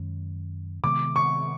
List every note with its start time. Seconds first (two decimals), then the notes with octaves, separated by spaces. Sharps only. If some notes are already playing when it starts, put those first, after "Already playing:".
Already playing: F#2 D#3 G#3 C#4
0.83 C3 D#3 G#3 B3 D6
1.16 C#6